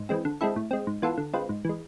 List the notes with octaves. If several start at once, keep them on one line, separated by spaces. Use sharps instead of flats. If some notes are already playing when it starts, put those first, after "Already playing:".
Already playing: G#2
E3 G#3 C4
D3
G#3 C4 E4 A4
A2
G#3 C4
G#2
E3 B3 F4 A4
D3
G#3 C4 F4 B4
G#2
E3 G#3